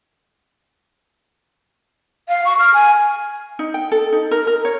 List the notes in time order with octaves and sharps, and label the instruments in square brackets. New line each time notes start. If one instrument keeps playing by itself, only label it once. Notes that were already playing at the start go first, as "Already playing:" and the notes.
[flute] F5
C#6
F6
G#5
[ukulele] D#4
G5
A4
D#4
A#4
A#4
C#5